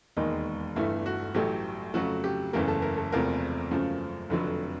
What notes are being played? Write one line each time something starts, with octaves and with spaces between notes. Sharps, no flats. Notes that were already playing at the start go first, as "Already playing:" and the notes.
E1 D#2 D#3 G#3 D#4
G1 G2 E3 A3 E4
F#4
A1 A2 F#3 A3 G4
F2 C#3 F#3 A3 F#4
G4
F#1 E2 C#3 E3 A3 A#4
A4
A#4
A4
E1 E2 C3 F3 A3 A#4
F#2 C#3 F3 A3
F1 F2 D3 F#3